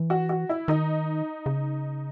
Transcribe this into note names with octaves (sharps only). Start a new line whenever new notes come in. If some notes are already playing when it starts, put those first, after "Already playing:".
Already playing: E3
F#4
F#4
E4
D#3 D#4
C#3